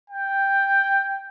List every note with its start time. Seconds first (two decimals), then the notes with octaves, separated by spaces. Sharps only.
0.10 G5